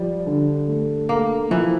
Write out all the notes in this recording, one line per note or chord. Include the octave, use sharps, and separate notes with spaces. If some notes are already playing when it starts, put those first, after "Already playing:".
Already playing: F3 G3
D3
A3
A3 A#3
E3 F3